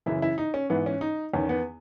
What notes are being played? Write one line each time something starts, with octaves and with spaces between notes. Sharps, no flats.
F#2 C#3 E3 E4
E4
D#4
C#4
G#2 E3 B3
C#4
D#4
E2 D#3 C#4
B3